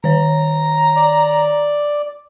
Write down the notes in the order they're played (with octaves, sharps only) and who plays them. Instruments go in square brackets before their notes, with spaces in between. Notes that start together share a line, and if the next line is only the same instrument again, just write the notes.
[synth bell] D#3 C#5 [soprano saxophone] A#5
[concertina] D5